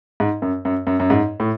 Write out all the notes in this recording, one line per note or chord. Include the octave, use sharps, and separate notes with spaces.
G#2
F#2
F#2
F#2
F#2
G#2
A2